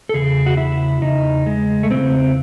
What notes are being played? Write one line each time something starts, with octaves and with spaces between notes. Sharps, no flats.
A4
E2 C#3 G#4
F#4
E4
E2 C#3 D#4
G#3
A3
E2 C#3 E3 C4